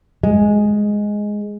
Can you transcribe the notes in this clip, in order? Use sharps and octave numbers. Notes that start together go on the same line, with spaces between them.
G#3